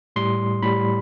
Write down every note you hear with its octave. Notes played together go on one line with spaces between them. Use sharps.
A2 G3 C6
A2 G3 B5